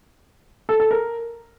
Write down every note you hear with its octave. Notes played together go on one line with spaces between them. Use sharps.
A4
A4
A#4